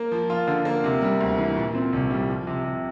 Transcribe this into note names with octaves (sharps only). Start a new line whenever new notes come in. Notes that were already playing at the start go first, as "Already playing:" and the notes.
Already playing: A#3
F3
F4
D3
A#3
C3
G3
D2
E3
A#2
C4
C2
G3
F3
C3
C3